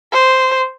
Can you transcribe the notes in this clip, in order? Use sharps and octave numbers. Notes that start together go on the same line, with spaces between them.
C5